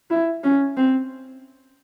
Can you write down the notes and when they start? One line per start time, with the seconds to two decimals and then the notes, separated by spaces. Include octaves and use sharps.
0.10 E4
0.44 C#4
0.77 C4